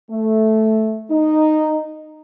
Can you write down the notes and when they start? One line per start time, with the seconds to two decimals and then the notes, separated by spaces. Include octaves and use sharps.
0.10 A3
1.10 D#4